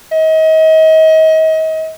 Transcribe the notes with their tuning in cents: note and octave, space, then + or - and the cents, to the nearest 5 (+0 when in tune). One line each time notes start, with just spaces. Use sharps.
D#5 +35